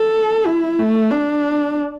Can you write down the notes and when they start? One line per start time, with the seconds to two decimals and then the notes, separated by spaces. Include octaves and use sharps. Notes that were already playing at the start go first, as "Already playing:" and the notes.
Already playing: A4
0.46 E4
0.79 A3
1.11 D4